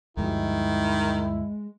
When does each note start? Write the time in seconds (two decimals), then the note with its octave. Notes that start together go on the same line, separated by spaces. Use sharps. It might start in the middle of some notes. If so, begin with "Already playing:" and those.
0.17 D2 G2 D#3 F3 G#3 E4